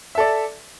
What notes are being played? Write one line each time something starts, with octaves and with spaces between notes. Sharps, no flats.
A4 D5 E5